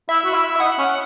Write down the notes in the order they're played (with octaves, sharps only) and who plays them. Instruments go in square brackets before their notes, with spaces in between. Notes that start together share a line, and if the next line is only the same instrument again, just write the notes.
[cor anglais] E4 [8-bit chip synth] E5
[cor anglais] F#4
E4
E4
[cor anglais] D#4 [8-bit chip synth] F#5
[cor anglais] C#4